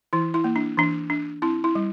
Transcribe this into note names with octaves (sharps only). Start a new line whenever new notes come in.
E3 E4
E4
A#3
D4
E3 D4
D4
C4 E4
E4
G3